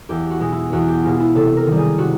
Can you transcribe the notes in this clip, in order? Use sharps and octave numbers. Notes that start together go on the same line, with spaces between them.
E2 G4
F#4
B2 G#3
E4
E2 F#4
G4
B2 G#3 F4
E4
C3 A4
A#4
D#3 G3
G#4
C3 F#4